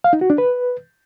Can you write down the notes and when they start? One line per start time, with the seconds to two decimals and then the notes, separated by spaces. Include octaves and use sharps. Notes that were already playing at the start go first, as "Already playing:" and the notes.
0.04 F5
0.13 D#4
0.21 F#4
0.30 D4
0.38 B4